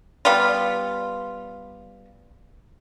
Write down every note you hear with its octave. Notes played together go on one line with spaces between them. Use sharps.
G3 B3 F4